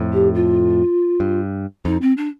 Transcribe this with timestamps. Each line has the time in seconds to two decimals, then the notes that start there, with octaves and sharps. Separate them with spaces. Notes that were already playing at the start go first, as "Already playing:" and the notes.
Already playing: F2 A2
0.13 G4
0.34 F4
1.20 G2
1.85 F2 D#4
2.01 C4
2.17 D4